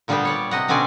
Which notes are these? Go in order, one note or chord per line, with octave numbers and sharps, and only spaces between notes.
A#2 D3 G3 B3 D5 G5
C#5 D5
C3 D#5 F#5
B2 D3 C4 C#4 D5 G#5